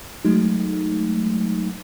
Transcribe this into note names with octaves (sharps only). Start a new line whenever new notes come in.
F#3 G#3 A3 D#4